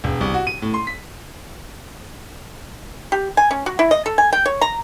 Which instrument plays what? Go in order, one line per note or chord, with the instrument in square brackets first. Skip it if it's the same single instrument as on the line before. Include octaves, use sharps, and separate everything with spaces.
[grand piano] E1
C2
F#4
D#7
A2
C6
B6
[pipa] G4
G#5
C#4
F#4
E4
D#5
A4
G#5
G5
C#5
A#5